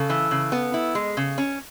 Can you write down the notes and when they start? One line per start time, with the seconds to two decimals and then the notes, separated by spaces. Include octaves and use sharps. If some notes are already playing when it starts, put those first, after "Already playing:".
Already playing: C#3 A4
0.10 E3
0.31 C#3
0.52 B3
0.74 E4
0.95 G#3
1.17 C#3
1.38 C#4